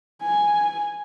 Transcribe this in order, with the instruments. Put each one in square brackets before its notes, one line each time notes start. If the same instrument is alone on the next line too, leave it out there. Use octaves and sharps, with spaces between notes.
[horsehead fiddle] G#5